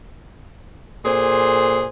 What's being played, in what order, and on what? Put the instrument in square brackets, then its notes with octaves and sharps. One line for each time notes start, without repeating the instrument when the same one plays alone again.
[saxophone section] A#2 G#4 A4 C5